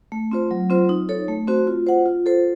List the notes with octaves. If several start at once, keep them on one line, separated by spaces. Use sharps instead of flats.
A3
C4 F4 C5
F#3
C4 F4 C5
D#4
A4 C#5
A3
C4 F#4 C5
F4
C5 F#5
F4
A4 C5